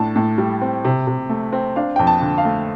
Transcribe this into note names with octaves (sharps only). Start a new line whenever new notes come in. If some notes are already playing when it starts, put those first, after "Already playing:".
Already playing: A2 D4 A5
A2
G3
C4
C3
C3
A3
C4
D4 F5
F2 G5
A5
D3
F5
A3